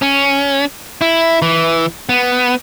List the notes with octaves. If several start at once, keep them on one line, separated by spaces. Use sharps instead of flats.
C#4
E4
E3
B3